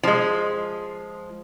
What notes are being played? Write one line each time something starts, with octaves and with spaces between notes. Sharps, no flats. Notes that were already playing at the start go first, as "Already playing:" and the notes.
F3 G#3